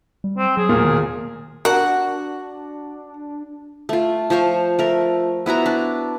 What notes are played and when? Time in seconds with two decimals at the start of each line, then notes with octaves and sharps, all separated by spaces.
0.24 G3
0.37 C4
0.57 F#3 G#4
0.69 E1 A#2 A3 A#4
0.85 D#3
1.65 D4 F#4 A#4 F#5
3.89 A3 F4
4.30 F3 C5 F5 C#6
4.79 A3 A#4
5.46 B3 E4 F#4 A#5
5.66 D4